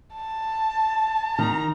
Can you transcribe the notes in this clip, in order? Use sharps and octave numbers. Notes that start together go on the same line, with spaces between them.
A5
D#3 A#5